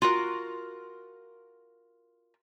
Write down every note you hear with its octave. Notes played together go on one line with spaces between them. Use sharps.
F4 F#4 A#4